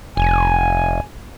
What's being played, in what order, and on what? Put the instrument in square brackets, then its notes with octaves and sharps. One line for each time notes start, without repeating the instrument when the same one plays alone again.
[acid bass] F1 [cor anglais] G#5